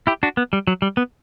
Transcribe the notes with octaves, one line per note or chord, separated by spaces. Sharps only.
E4 G4
D4 F#4
B3
G3
F#3
G3
B3